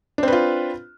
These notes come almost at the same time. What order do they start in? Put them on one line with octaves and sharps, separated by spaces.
D4 C4 B4 F4